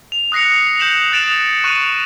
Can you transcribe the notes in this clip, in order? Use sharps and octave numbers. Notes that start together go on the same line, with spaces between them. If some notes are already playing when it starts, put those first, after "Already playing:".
F7
D#6 F#6 A#6 C7 C#7
D#6 G6 C7 C#7 E7 F#7
D#6 F#6 A6 D7 E7
C#6 F#6 D#7